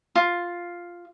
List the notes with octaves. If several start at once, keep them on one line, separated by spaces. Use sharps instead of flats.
F4